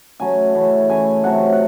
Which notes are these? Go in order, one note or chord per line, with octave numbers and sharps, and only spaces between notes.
C#3 F#3 A3 G#5
C#3 E3 A3
C#3 E3 A3 G#5
C3 F#3 A3 F#5
F#5